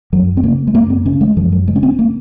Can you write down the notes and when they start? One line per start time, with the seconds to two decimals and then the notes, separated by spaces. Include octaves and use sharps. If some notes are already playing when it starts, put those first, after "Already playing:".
0.12 F#2 F#3
0.37 C4
0.43 C#3 A#3
0.67 G#3
0.74 F#2 A#3
0.90 C4
1.06 C#3 C#4
1.21 G#3
1.37 F#2 F3
1.52 F#3
1.67 C#3 G#3
1.76 C#4
1.83 C4
1.99 A#3